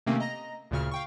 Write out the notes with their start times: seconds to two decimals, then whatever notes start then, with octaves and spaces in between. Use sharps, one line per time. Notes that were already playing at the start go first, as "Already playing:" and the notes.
0.06 C3 D#3 A3 A#3 C4 C#4
0.20 D#5 A#5 A#6
0.71 D2 A#2 C#3 C#6 F6
0.91 F5 G5 C#6